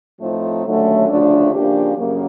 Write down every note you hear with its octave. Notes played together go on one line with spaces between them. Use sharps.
A2 F3 A3 C4 D#4
D#2 D3 F#3 A3 C#4
D2 C#3 F3 A3 D4
C#3 F3 A#3 D4 G4
F#2 C#3 F#3 A#3